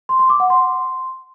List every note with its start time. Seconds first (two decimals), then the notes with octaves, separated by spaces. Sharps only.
0.09 C6
0.19 C6
0.30 D6
0.40 F#5
0.50 C6